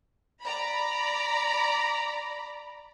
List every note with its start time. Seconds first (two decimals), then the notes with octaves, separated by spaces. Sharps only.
0.42 D5 A#5 B5